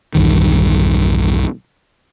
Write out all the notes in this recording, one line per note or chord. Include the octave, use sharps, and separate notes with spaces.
B1 E2 G2 D#3